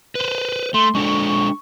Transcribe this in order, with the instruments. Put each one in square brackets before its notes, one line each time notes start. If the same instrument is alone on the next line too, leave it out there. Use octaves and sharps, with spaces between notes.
[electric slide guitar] B4 C5
[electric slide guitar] A3 [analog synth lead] C6
[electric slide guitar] G#3 D4 A4 [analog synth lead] C#6